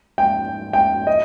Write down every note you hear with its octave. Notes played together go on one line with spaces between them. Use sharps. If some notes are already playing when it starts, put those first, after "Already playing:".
G5
G5
D#5